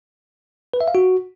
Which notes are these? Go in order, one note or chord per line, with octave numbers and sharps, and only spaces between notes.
B4
E5
F5
F#4